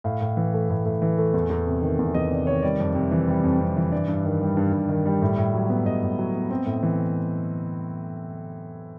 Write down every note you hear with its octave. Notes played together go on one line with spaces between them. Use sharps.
A2 F5
A2
E3
A3
A2
A2
E3
A3
E2
E2
C3
D#3
E2
E2 D#5
C3 D5
D#3 C#5
G3 D5
F2
C3
E3
G3
F2
C3
E3
G2 D5
G2
D#3
G3
G2
G2
D#3
G3
A2
A2
F#3
B3
A2 D#5
A2
F#3
B3
C4
A2
E3